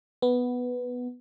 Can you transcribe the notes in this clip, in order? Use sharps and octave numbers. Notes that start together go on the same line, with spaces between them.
B3